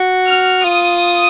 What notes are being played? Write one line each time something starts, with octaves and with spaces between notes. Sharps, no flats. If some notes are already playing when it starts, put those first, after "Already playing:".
Already playing: F#4
F6
F4 D#6